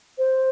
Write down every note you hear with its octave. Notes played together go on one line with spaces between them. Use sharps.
C5